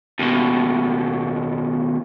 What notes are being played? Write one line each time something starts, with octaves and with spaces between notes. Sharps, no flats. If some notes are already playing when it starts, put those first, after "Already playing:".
D#2 B2